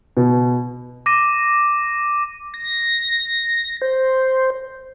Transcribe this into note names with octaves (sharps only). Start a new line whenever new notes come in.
B2
D6 A#6 D#7
A#6
C5